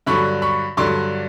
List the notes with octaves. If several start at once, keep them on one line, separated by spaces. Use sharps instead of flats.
G2 D3 F#3 B5 C#6
B5 C#6
G2 D3 F#3 C6 D6